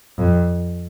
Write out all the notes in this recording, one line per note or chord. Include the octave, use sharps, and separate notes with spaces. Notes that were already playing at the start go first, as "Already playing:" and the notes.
F2